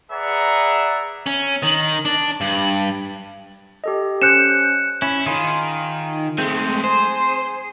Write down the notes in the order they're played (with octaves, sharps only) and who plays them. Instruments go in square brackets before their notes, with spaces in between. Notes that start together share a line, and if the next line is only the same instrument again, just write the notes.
[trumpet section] G#4 B4 D5 E5 F#5 A#5
[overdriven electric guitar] C#4
D#3
D4
G2
[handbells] G4 A4 D#5
[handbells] C#4 C5 G6 [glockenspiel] F#6 C#7 E7
[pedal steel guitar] C#4 [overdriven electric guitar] E4
[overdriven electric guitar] D#3 [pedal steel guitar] F4 G#4
[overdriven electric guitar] G#3 A3 [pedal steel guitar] C4
[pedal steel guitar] G#4 [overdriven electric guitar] C5